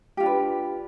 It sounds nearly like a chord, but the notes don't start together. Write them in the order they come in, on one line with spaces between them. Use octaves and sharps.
G4 F4 D4 B4